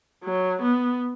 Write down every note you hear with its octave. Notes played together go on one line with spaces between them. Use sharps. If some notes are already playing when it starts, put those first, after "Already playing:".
F#3
B3